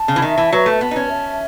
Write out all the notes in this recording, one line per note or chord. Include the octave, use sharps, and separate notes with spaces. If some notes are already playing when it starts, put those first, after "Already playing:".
Already playing: A5
C#3
E3
D#3 E5
E3
F#3 B4
A3
B3 A5
D#4
C#4
E5